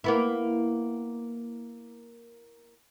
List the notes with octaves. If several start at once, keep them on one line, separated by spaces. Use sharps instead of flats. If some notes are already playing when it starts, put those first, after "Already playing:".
A#3 B3 E4